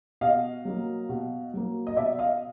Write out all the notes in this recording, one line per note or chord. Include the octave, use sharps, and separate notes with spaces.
B2 D#5 F5
F#3 A#3
B2
F#3 A#3
D#5
B2 D5 E5
D#5 F5